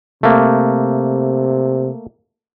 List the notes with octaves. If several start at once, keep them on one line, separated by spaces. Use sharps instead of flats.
C3 A3 A#3